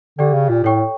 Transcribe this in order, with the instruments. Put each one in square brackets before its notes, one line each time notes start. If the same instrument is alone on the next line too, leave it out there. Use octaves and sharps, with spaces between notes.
[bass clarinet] D3 [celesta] G4 D5 G5
[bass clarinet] C#3
A#2
[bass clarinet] A2 [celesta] A4 C#5 G5 C#6